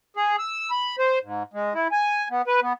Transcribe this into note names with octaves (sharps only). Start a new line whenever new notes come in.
G#4
E6
B5
C5
G#2
G#3
E4
G#5
B3
B4
B3